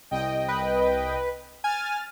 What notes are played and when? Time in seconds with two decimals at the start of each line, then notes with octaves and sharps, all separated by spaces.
0.11 C2 D#5 G5
0.48 B4
1.64 G#5 F6 A6